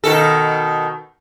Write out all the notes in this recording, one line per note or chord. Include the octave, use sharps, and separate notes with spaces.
B2 D#3 A4